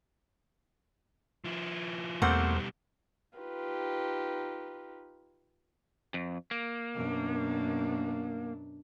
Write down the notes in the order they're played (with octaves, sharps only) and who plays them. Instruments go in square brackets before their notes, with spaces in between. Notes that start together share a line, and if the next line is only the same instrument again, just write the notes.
[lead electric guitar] F3 E4
[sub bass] E2 [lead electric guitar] B2 G3 [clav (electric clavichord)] A3 A#3 C4 [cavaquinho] C5 F#5
[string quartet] D#4 F4 G4 B4
[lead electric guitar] F2
A#3
[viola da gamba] F#2 B2 D4